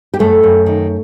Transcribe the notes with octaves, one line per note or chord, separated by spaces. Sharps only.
G4
F#2 A3 A4
F#2
D#3